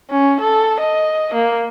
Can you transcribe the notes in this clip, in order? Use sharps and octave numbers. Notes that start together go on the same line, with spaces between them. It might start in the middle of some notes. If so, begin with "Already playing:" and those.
C#4
A4
D#5
A#3